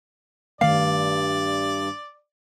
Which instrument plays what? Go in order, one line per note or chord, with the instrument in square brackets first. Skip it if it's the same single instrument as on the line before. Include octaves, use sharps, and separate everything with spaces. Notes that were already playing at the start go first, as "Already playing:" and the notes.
[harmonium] G2 [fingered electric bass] D#3 A3 [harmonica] D5 [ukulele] F5